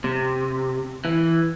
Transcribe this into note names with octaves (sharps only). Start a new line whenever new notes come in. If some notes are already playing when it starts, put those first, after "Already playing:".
C3
E3